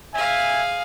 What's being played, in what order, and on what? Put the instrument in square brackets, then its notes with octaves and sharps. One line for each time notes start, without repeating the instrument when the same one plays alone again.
[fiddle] G#4 F5 [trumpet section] E5 G#5